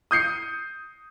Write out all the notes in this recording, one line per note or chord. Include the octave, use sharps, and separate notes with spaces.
D#6 G6 C7 C#7